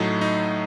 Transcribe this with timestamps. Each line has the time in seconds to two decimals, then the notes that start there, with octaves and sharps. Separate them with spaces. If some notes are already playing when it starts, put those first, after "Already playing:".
Already playing: A2 F#3 A3 D#4
0.21 D#4